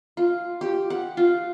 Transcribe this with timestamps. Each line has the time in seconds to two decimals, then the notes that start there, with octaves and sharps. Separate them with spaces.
0.17 F4
0.61 G4
0.90 F#5
1.17 F4